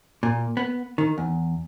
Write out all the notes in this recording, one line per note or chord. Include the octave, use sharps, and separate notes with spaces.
A#2
B3
D#3
E2